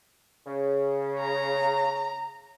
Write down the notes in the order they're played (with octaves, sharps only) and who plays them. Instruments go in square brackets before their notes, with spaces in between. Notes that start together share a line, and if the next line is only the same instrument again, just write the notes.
[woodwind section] C#3
[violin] A#5